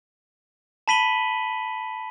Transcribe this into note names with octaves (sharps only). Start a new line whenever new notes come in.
A5 B5 B6 D#7 F#7 G7